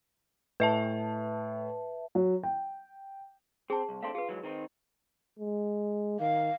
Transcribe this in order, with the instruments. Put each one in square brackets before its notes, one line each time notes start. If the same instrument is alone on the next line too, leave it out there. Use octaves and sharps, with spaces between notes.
[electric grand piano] A2 [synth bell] B4 E5 A5
[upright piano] F#3
G5
[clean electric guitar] C4 [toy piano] G#4 A5
[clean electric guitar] C2
[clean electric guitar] A3 C4 D4 [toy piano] F5 C6
[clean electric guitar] F4 [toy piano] G#4 B4
[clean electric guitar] E3 F#3 G#3
D#3 C4 D#4
[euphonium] G#3
[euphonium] D#3 [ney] F5